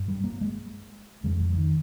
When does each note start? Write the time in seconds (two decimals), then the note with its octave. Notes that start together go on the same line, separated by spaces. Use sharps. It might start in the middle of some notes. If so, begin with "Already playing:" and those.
Already playing: G2
0.08 G3
0.24 A#3
0.41 G#3
1.24 F2 C#3 G#3
1.40 F3
1.56 D#3